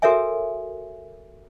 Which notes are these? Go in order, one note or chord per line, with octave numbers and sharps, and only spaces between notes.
F#4 A4 A#4 C#5 E5 G#5